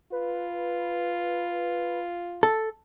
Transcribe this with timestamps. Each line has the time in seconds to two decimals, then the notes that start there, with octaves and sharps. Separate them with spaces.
0.12 F4 B4
2.43 A4